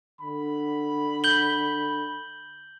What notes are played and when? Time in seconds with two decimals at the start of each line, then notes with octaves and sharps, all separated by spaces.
0.20 D3 B5
1.24 G6 F#7 G7